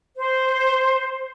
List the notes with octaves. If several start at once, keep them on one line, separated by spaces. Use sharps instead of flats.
C5